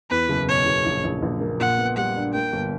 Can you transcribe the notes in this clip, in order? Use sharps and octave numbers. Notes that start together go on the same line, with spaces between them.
E2 B4
F#1
B2 C#5
F#1
A#1
A#1
A#1
A#3
A#2 F#5
B3
G3 F#5
D4
A#3 G5
G1